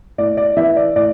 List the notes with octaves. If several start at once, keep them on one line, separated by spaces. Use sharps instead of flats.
A2 D5
D5
E3 E5
D5
A2 D5